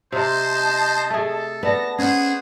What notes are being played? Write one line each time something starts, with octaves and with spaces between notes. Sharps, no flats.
C3 C5 D#5 A5
A3 G#4 A4
B3 D5 A5 A#6
C#4 G#4 C5 F#5